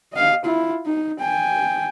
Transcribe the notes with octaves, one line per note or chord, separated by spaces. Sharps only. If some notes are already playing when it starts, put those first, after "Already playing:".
D#5 F5
E4 F4
D#4
G5 G#5